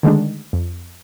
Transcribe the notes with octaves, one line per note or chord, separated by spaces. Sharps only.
D3 D#3 G#3 A3 D4
F2